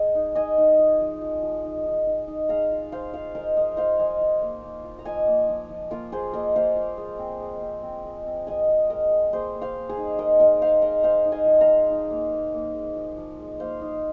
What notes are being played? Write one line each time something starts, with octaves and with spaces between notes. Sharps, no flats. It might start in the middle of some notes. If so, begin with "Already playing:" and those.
Already playing: G#3 D#5 G#5
D#4
D#4 D#5 G#5
D#4
F3
F3
F3
F3
D#4
D#4
D#4
D#4
G#3 F5 A#5
F4
F4 C5 F5
F4 C5 F5
G#3 A#4 D#5
F3 A#4 D#5
F4 C5 F5
F3 D#5 G#5
F4
A#3
A#3
F4
A#5
F3 D#5 G#5
A#3
F3
F3
A#3 F4 A#4
A#3 G#4 C5
A#3 A#4 D#5
A#3 C5 F5
F4
G#3
C4
G#3
C4
C4
G#3
C4
G#3 D#5 G#5
G#3
G#3 A#4 D#5
G#3
A#3 G#4 C5
A#3
C5 F5
A#3
G#4 C5
D#4
G#3 A#4 D#5
D#4 A#4 D#5
G#3 C5 F5
G#3 A#4 D#5
G#3 C5 F5
D#4
D#5 G#5
F3
F5 A#5
G#3
D#4
A#3
A#3
A#3
G#3
F3
F3
G#3
A#3 C5 F5
D#4